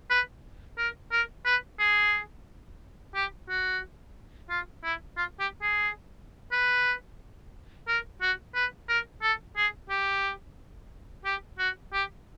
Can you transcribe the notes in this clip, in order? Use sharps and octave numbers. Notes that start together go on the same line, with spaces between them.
B4
A#4
A#4
B4
G#4
G4
F#4
F4
E4
F4
G4
G#4
B4
A#4
F#4
B4
A#4
A4
G#4
G4
G4
F#4
G4